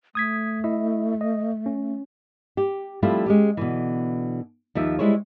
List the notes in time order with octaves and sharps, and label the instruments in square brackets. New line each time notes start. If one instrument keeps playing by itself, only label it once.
[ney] A3 [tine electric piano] D#6 G#6 B6
[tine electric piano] E4 D#5 E5
D#5
C#4
[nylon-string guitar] G4
F3 G3 A3 C4 E4 F4
G#3 C#4 G4
B2 D3 E3
D#2 F3 E5
G3 G#3 E4 G#4 C5 C#5